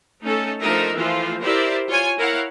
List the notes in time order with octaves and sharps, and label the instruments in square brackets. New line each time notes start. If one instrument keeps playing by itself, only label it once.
[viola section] A3 C#4 D#4 A4
F3 A3 D4 D#4 A#4 E5
E3 F3 A3 F4
E4 G4 A#4 C5 D5 E5
F4 C#5 G#5
E4 A#4 C#5 F5 F#5